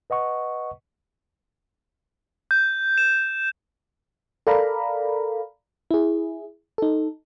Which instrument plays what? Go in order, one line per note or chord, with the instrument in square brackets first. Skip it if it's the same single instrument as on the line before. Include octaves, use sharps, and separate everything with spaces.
[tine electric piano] B4 D#5 F#5 C#6
[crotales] G6
E7
[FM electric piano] A4 A#4 D5 F5 A#5 B5
E4 G#4
D#4 A4